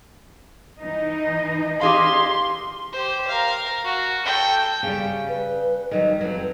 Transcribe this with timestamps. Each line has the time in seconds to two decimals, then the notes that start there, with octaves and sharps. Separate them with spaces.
0.78 E3 D#4 D#5
1.81 G4 G#4 F5 C6
2.92 G4 C5
3.28 A#4 F5
3.85 F#4
4.25 A4 G5
4.83 C#3 G3
5.29 B4
5.91 D#3 F#3 G3 D#5
6.21 F2 F#3 B4